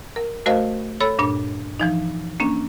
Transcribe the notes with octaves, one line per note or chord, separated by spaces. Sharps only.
A#4
A3 F#4 A#4 C5 D#5 F5
A4 C#5 B5 E6
G2 A#2 D4
E3 F3 D#4
A#3 C#4 D4